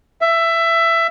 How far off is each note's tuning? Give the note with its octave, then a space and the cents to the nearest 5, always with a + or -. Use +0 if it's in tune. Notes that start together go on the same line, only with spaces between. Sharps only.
E5 +15